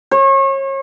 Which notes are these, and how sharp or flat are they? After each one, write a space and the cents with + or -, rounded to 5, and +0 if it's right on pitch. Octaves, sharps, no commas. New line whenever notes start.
C#5 -35